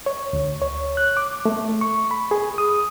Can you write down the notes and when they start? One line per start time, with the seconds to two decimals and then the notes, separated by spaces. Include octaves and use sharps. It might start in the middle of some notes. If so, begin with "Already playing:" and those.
0.06 C#5
0.33 D2
0.62 C#5
0.97 F#6
1.17 D6
1.46 A3
1.81 C#6
2.11 B5
2.31 G#4
2.58 D#6